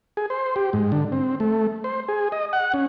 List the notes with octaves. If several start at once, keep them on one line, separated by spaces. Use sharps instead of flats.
G#4
C5
G4
G#2
D3
C4
A3
C5
G#4
D#5
F#5
C#4